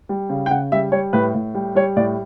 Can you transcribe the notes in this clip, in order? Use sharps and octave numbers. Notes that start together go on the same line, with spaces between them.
G3
C#3
G5
C#3 F#5
G3 E5
G3 C#5
A2 B4
A2
G3
G3 C#5
A2 D5